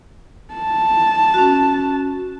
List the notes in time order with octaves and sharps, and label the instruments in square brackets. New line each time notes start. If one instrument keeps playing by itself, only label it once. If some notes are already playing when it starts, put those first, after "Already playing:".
[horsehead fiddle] A5
[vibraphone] C#4 F#4